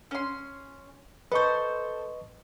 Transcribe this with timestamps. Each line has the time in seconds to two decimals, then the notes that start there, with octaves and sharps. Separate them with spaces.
0.11 C#4 C6
1.32 A4 B4 C5 D#5 C#6